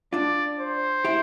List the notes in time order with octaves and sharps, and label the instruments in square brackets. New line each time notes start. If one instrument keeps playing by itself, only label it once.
[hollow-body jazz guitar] D4 F4 [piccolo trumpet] D5
[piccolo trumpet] C5
[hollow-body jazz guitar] E4 G4